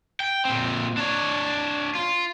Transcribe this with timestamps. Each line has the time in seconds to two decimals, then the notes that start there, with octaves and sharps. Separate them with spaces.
0.20 G5
0.45 A#2 C4
0.97 D4 C#5
1.95 F4